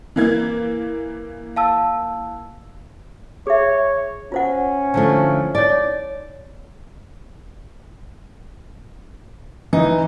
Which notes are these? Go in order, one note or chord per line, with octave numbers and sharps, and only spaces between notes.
E3 A#3 G#6
F5 A5 E6
G#4 C#5 E5
C#4 F4 C5 F#5
D3 F3 A3
D#4 C#5 D5
E3 D#4